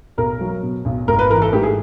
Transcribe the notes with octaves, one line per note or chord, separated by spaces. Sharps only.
B1 A#4
F#3
B2
B1
G#1 A#4
B4
E3 A#4
A4
G#2 G4
G#4